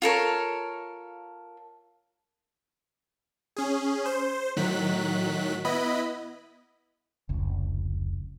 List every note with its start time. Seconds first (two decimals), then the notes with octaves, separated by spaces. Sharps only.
0.02 F4 A4 A#4 C#5
3.57 C#4 G#4
4.06 C5
4.57 A2 D#3 F#3 F#6 B6
5.65 B3 E4 D#5 B5
7.29 F1 C#2